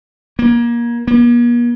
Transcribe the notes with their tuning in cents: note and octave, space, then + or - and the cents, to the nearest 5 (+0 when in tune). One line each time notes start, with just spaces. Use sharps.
A#3 +25
A#3 +45